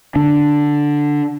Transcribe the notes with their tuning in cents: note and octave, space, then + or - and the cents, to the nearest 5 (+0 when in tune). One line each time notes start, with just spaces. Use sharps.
D3 +0 D4 +0